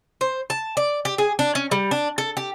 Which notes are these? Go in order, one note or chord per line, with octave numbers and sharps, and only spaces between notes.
C5
A5
D5
G4
G#4
D4
C#4
G3
D4
A4
G4